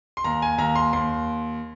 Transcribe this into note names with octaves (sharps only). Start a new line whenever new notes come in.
C6
D#2 A#5
G#5
D#2 A#5
C6
D#2 C6